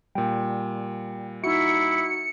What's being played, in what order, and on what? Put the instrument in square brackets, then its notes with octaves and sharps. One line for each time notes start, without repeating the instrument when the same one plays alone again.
[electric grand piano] A#2 G3 [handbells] G5
[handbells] D#4 F#4 [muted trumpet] E4 [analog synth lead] C#7